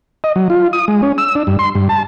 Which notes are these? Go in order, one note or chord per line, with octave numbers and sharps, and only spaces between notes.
D#5
F#3
F4
D#6
G#3
C#4
E6
D4
G2
C6
G2
A5